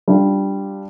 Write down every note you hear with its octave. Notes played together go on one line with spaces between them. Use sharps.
G3 D4 F4